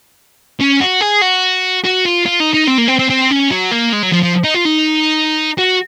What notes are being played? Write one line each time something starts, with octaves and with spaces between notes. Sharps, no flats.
C#4
F#4
G#4
F#4
F#4
F4
F4
D#4
D#4
C4
A#3
C4
C4
C4
C#4
F#3
A#3
G#3
F#3
F3
F3
D#4
F4
D#4
F#4